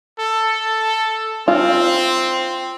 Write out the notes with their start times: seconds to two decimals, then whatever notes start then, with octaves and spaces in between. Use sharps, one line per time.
0.19 A4
1.48 C4 F4